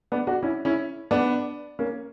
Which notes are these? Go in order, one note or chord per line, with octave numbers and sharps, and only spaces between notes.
B3 D4
D4 F#4
C#4 E4
C#4 E4
B3 D4
A#3 C#4